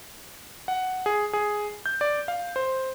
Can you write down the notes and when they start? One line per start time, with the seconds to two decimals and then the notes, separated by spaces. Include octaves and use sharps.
0.68 F#5
1.06 G#4
1.33 G#4
1.86 G6
2.01 D5
2.28 F5
2.56 C5